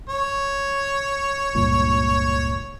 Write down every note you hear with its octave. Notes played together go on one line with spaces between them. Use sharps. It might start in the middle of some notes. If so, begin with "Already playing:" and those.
C#5
C#2 G2 A#2